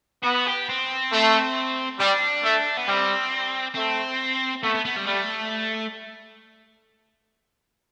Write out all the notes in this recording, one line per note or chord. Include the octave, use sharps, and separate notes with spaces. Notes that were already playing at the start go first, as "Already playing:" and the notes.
B3 F#4
G4
C4
A3
G3 D4
A3
B3
G3 C4
A3 C4
A3 B3
B3
B3
G3
G3 A3